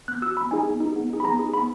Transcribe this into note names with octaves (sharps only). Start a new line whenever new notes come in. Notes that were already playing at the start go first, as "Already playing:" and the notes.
B3 F#6
F#4 E6
B3 B5
D#4 G#4 G#5
B3
D#4 G#4
B3
D#4 G#4
B5
B3 A#5
D#4 G#4
B3 B5